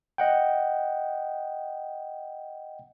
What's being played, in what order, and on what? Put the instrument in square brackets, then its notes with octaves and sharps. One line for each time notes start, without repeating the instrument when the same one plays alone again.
[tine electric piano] D#5 F#5 G5